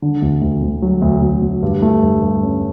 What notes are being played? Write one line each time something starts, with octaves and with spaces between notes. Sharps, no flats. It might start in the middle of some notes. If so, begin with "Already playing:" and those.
D3
D2
D2
D2
F#3
D2
D2
D2
G2
A3
G2
G2
C#4